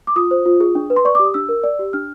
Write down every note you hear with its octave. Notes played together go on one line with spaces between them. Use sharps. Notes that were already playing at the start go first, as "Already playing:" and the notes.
D6
F4 D#6
C5
F4
G#4
D4
B4
C6
D5 C#6
D6
G4
D#6
D4 E6
A#4
D5
G4
D4 F6